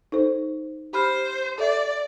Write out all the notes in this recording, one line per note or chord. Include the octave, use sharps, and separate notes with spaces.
D#4 A4 C5
G4 C5 B5 F6
A4 D5 E5